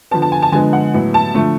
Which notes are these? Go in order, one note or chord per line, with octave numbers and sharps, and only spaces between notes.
D3 F3 B3 A5
A5
G#5
A5
D3 F3 G#3 B3 G#5
F#5
A2 F#3 B3
A5
D3 F3 A3